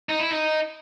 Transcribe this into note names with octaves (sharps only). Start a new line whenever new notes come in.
D#4
E4
D#4